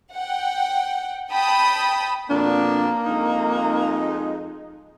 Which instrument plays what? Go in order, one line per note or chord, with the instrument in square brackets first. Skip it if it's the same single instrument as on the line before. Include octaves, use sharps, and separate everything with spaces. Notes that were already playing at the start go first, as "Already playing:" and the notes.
[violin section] F#5 G5
G5 A5 B5 D#6
[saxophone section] F2 B2 D4 [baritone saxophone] A#3
[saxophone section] F2 G#3 D#4